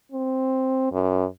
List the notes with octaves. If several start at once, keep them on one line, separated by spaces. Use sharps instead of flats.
C4
F#2